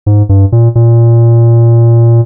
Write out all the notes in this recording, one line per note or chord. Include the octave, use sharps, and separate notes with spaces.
G#2
G2
A#2
A#2